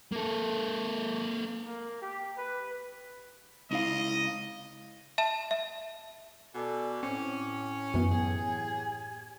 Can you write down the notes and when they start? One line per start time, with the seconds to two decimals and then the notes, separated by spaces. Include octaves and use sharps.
0.12 A#3 A4
1.65 A#3
2.02 G4
2.37 B4
3.71 C#2 E4 D#5 F5
5.18 E5 A5 E7
5.51 E5
6.54 B2 A4 D5 G#5 D6
7.03 A2 C4 C#4
7.94 F#2 E3 B3 G4 G#5 G#6
8.11 G#4